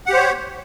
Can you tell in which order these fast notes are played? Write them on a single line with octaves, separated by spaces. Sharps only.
F#5 G4 C5 C#5